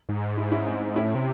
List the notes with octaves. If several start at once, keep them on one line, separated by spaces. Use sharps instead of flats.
G#2
E4
C#4 E4
C4 D#4
A2 C#4 E4
C3